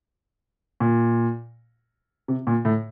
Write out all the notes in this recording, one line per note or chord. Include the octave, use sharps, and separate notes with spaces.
A#2
C3
A#2
A2